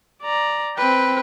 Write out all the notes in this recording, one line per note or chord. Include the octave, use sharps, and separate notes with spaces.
D5 A#5
C4 B4 G5